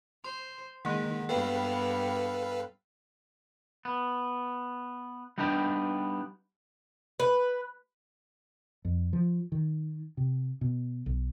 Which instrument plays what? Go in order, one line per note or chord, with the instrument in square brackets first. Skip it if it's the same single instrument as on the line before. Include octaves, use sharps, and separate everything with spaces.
[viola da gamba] C5 [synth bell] C6
[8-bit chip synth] D#3 [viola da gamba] G#3 [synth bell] A#3 F#5
[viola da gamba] G2 B3 [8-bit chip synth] A4 B4 F5 [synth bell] G5
[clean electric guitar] B3
G3 B3 D4 D#4 G4
[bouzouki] B4
[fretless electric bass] F2
F3
D#3
C3
B2
B1